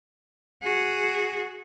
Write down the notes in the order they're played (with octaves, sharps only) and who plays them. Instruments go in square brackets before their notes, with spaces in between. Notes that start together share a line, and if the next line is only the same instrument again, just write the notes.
[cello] F#4 G#4